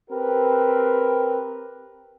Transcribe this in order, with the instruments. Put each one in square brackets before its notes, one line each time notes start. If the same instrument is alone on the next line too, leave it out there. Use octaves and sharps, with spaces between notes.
[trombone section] C4 G4 A#4 B4